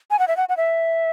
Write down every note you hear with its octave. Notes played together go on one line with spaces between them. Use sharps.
G#5
F#5
E5
F#5
F#5
E5